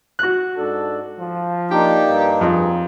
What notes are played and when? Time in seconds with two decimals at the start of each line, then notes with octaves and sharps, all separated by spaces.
0.19 F#4 F#6
0.57 G#2 D4 A4
1.17 F3
1.71 A#3 D4 D#4 G4
2.09 G2
2.41 F2 G#4